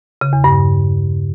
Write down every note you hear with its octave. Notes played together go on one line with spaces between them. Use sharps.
C#3
E2
G2